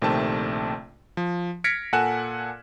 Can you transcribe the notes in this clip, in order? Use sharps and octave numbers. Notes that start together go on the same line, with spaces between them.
A#1 C3 D#3 A3 C4 A5
F3
F6 G#6 A#6 B6 C#7 D7
A#2 A4 F#5 G#5 F#6 E7